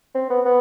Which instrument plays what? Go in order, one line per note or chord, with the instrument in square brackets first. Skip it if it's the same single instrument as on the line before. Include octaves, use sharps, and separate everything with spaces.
[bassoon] C4
B3
B3